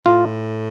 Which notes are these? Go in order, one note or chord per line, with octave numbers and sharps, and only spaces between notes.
A2 F4